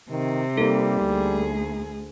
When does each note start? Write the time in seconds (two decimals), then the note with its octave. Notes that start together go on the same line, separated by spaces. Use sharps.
0.10 C3 D#3
0.57 G3 A#3 D#4 A4
1.00 D2 G#4